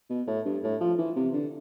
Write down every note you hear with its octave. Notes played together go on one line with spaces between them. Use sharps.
B2
A2
G2
A2
F3
E3
C3
D3